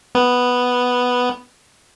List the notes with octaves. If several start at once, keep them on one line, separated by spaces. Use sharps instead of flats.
B3